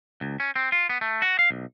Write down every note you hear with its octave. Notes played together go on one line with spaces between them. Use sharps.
C#2
C#4
C4
F4
B3
A3
F#4
F5
B1